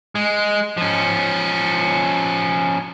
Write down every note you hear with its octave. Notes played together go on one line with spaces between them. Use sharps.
G#3
F3 C#4